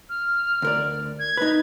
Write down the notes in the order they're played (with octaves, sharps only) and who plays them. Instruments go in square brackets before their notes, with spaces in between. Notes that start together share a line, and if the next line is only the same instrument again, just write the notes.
[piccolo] F6
[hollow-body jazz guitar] D2 A#4 D5
[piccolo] G#6
[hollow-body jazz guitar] D#4 B4